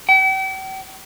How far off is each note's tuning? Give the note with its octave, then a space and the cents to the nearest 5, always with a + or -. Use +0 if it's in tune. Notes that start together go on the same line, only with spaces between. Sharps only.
G5 -40